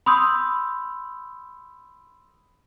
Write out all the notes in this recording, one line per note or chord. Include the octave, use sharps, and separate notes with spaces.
B5 C6 D#6 E6 G6